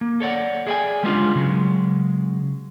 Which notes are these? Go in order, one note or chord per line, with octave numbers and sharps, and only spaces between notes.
A#3
A4 C#5 D5 F#5
G#4 D5 E5 F5 G5 G#5
G3 G#3 B3 C#4 D4 F4
C#3 F#3 G#3